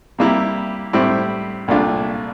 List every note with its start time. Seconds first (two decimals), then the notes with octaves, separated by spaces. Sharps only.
0.18 C3 G3 A#3 E4 G4
0.93 A2 G3 C4 E4
1.68 C2 A#2 A3 D4 F4